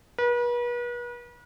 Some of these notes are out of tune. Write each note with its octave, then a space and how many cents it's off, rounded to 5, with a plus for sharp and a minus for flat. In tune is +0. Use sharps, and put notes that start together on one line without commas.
B4 -40